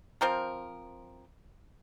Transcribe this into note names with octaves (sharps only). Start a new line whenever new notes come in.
F3 C4 A#4